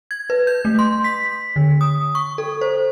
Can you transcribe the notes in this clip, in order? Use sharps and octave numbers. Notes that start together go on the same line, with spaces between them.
G#6
B4
G6
A3
C6
B6
D3
D#6
C#6
A4
C5